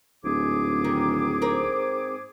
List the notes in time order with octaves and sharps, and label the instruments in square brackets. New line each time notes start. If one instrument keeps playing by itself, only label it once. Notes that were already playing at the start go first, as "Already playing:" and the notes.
[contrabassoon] D1 [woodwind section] G#2 G#4 D6
[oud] D#3
C4 A#4